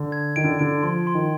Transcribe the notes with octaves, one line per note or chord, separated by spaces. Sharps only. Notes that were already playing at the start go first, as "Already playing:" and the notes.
Already playing: D3
G#6
D#3 D7
D3
D3 D7
F3 C6
C6
D#3